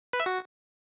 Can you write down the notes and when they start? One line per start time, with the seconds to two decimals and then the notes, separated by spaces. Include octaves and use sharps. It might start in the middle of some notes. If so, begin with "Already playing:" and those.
0.13 B4
0.20 E5
0.26 F#4